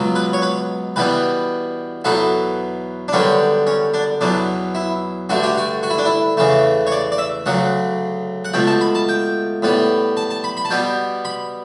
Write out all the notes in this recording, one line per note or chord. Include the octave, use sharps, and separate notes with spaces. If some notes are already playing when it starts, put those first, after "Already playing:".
Already playing: C#2 B2 F#3
B4
C#5
B4
E2 B2 G3 B3 B4
E2 B2 F#3 B3 A4
D4
F#2 D3 G3 B3 C#4
C#4
D4
E2 B2 F#3 D4
E4
G2 D3 A3 F#4
G4
F#4
F#4
E4
D4
E4
E2 C#3 E3 A3
C#5
D5
D5
E5
D2 C#3 F#3 F#5
F#5
C#2 B2 A3 G5
A5
B5
A5
G5
A2 G3 B3
A5
A5
B5
B5
A5
B2 G3 B3 G5
B5